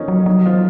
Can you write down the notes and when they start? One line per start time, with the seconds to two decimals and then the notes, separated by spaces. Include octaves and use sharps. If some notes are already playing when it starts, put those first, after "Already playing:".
Already playing: F3 A#3 C#4 D#4
0.08 F#3
0.26 F#3 D#4
0.46 F3 F4